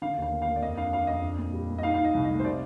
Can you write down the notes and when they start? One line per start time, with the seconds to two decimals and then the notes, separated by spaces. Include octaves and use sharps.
0.02 D3 F5
0.17 D#2
0.22 F5
0.32 A#3
0.42 F5
0.47 A#3
0.56 D5
0.62 F2 D#5
0.77 D4 F5
0.93 D4 F5
1.07 F2 D#5
1.23 D4
1.38 A#2
1.54 G3
1.69 A#2
1.78 D#5
1.83 D#4 F5
1.94 D#4 F5
2.04 D#5
2.14 C2
2.25 A3 D#5
2.39 C5
2.45 C3 D5